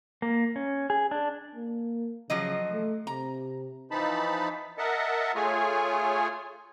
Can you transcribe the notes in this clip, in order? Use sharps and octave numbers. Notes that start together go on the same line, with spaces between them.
A#3
C#4
G#4
D4
A#3
C#3 F3 F#3 D#5
A3
C3 A#5
E3 F3 D#4 A5 B5
A#4 D#5 E5 F#5 A5
A3 F4 G#4 C#5 G#5